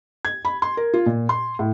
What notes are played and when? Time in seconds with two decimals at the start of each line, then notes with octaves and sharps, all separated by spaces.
0.25 G#6
0.45 B5
0.62 C6
0.77 A#4
0.94 F4
1.06 A#2
1.29 C6
1.59 A2